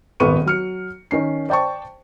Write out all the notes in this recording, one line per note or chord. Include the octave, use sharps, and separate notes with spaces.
D#1 G#1 B3 C#6 D#7
F#3 F6 C#7
D#3 C#4 C7
C5 D5 G5 A5 C#6